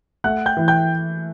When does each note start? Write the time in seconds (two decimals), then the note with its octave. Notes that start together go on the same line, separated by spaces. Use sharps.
0.24 A3 F#5 F#6
0.46 G5 G6
0.57 E3
0.68 G5 G6